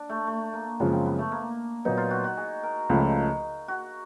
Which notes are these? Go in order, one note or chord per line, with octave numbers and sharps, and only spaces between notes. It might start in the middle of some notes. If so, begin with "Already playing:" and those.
Already playing: D4
A3
A3
A#3
F#2 C#3 F3 G#3 B3 C#4
C4
B3
A3
A#3
A#2 F#3 B3 D#4
F4
F#4
F#4
G#4
A#4
C#2 C#3 F3 A3
F#4